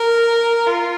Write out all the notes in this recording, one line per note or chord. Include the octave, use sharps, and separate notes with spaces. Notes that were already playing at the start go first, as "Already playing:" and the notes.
Already playing: A#4
F4